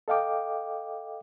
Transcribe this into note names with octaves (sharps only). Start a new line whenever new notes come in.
A4 D#5 F5 G5 D6